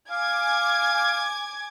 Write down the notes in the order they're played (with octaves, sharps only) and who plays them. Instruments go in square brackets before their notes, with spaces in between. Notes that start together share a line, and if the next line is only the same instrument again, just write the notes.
[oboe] F5 [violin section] G#5 D6 G#6